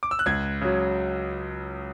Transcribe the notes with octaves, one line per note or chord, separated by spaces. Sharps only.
D6
E6
F#6
C#2 G#6
C#3 F#3